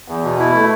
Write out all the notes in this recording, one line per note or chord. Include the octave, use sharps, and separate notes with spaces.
E2
B2
E4
A3